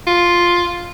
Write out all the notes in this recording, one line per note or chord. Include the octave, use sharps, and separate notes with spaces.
F4